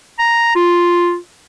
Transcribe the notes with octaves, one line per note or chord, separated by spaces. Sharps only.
A#5
F4